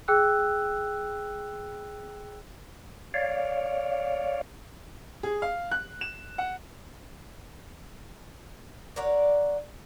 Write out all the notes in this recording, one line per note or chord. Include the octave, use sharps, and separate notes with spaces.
G#4 G5 E6 F#6
C#5 D5 F5
G#4
F5
F#6
E7
F#5
A#4 C#5 D5 F#5